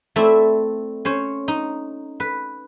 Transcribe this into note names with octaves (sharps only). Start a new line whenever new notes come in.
A3 C4 E4 D5
C#4 C5 C#5
D#4
B4